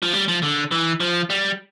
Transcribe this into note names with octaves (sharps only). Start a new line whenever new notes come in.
F3
G3
F3
D3
E3
F3
G3